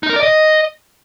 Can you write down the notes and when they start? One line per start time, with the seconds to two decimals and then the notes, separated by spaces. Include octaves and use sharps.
0.03 D#4
0.10 A#4
0.16 D5
0.23 D#5